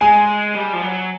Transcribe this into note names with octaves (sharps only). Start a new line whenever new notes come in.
G#3 G#5
G3
F3
F#3